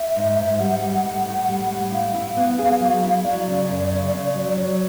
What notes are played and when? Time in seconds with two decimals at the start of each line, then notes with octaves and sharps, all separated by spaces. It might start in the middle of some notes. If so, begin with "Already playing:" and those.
Already playing: E5
0.16 G#2
0.38 G#2
0.60 G3 F#5
0.82 G3
1.04 A2
1.26 A2
1.49 G3
1.71 A2
1.83 F#5
1.92 E4 F5
2.14 E4
2.37 B3
2.59 G#4
2.80 F#3
3.03 E4
3.24 F#3 D5
3.48 C#3
3.70 F#2
3.91 C#3
4.13 C#3
4.35 F#3
4.46 D5
4.57 F#3 C#5